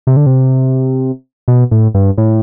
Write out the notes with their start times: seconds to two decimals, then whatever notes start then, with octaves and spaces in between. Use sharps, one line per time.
0.07 C3
0.16 D3
0.26 C3
1.48 B2
1.71 A2
1.94 G2
2.18 A2